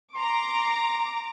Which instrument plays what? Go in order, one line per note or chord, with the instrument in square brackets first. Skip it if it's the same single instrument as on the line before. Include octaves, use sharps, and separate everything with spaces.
[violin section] A#5 D6 [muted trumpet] C6